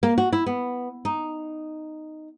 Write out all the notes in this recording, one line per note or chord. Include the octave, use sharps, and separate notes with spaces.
A#3
F#4
E4
B3
D#4